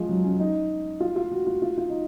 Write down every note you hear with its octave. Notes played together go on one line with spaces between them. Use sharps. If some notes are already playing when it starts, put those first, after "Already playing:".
Already playing: F3 G#3
F#3
C#4
D#4
F4
F4
F#4
F4
F4
F4
D#4